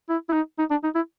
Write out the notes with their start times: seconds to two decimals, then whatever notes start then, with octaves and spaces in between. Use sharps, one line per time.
0.09 E4
0.29 E4
0.33 D#4
0.59 D#4
0.71 D4
0.84 D#4
0.95 E4